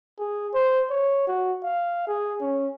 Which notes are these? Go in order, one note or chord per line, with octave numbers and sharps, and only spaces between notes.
G#4
C5
C#5
F#4
F5
G#4
C#4